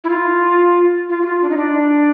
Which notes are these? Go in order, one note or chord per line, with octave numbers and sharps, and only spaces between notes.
E4
F4
F4
F#4
F4
D4
D#4
D4